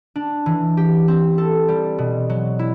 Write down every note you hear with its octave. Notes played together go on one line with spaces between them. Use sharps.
D4
E3
G4
C4
A4
G3
B2
F#3
E4